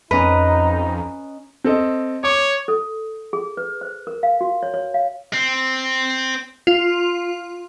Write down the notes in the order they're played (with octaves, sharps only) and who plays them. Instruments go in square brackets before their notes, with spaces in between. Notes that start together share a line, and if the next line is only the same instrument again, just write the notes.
[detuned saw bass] F2 [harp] C#4 D#5 A#5 [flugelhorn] D#4 [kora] B4
[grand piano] C4 A4 D#5
[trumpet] C#5 [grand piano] D6
[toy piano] A4
G#4
B4
C5
A#4
F5
F#4
C#5
C#5
F5
[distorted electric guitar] C4
[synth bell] F4